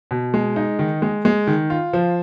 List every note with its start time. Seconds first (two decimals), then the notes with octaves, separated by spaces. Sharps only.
0.11 B2
0.34 G#3
0.56 D#4
0.79 D#3
1.02 G#3
1.25 G#3
1.47 D#3
1.70 F4
1.93 F3